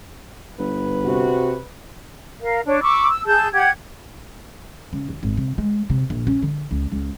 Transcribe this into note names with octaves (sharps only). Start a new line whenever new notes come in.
G1 B4
C3 F#4
A#4 F5
D4 C#5
B5 C#6 D6 E6
E6
G#4 A5 E6 G6
G4 F#5 G#6
C#3
D#2
G#1
C3
G#3
C3
A#1
C#4
D3
C#2
C#2